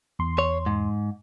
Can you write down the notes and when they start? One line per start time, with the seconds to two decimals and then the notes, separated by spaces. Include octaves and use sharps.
0.19 E2 C6
0.39 C#5
0.66 G#2